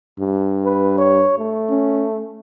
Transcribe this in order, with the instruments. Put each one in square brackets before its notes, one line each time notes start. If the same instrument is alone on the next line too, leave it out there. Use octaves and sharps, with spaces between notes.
[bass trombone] G2
[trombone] B4
C#5
A3
[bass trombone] C#4